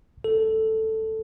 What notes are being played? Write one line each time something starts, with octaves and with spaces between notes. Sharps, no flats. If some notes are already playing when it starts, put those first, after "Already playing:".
A4